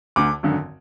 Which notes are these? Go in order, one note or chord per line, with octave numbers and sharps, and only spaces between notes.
D2 D3 D6
G#1 F#2 D3